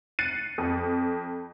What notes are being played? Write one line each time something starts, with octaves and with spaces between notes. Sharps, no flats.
F#6 A6 C7 C#7 D#7
F2